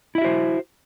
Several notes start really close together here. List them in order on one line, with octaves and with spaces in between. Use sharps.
E4 E5 F#4 C5